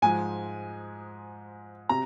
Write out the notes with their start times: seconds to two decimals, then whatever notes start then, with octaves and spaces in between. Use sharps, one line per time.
0.02 G#2 F3 G#3 G#5
1.89 C3 A#5